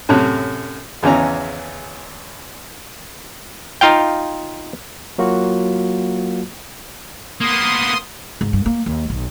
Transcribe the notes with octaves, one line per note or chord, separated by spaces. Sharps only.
F#2 A2 C3 C#5 F#6
G#1 E2 C#3 E3 C#4 A#5
D#4 F4 F5 G5
F#3 A#3 F4 F#4
A#3 B3 C6 D#6
G#2
G2
A#3
D#2
B1